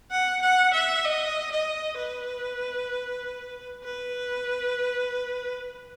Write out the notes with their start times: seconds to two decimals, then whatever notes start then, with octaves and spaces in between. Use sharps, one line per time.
0.11 F#5
0.42 F#5
0.74 E5
1.05 D#5
1.52 D#5
1.97 B4
3.84 B4